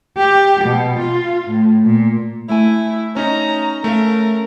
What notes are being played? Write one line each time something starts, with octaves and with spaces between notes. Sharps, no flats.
G4
B2
F4
A2
A#2
A3 E4 G#5
C#4 D#4 A#5
A3 C#4 A#4 E5 F5